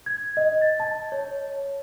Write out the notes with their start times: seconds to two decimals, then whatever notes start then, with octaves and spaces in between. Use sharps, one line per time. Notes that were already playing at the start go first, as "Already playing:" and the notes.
0.06 G#6
0.37 D#5
0.62 A6
0.80 A5
1.12 C#5